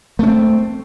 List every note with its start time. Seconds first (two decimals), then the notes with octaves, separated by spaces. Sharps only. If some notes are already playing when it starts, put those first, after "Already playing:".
0.19 A3
0.23 C#4
0.27 C4